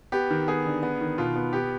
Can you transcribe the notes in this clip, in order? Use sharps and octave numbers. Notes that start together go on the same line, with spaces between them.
B3 G4
D#3
B3 G#4
D3
B3
D#3
B2 F4
B3
B3 G4